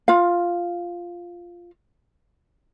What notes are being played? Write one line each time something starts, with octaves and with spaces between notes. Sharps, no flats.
F4 F5